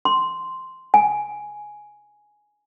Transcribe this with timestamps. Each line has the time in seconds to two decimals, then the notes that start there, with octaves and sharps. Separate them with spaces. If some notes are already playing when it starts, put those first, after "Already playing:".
0.05 C6
0.94 G#5